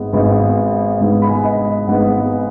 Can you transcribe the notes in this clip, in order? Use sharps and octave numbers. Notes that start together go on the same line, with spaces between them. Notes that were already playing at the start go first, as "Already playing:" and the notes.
Already playing: G#1 G#2 G#3 B3
G#1 G#2 G#3 B3
G#1 G#2 G#3 B3
B5
G#5
F#5
D#5
G#1 G#2 G#3 B3 F#5